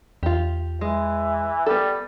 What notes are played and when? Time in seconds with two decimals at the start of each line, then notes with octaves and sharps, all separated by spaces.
0.23 E2 F4 G4
0.81 E3 G#3
1.66 G3 B3 A4